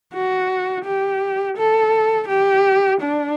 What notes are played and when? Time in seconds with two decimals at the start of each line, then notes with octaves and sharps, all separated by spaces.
0.14 F#4
0.84 G4
1.57 A4
2.28 G4
3.01 D4